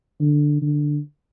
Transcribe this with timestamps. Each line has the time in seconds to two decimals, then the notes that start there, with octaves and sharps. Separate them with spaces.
0.20 D3
0.62 D3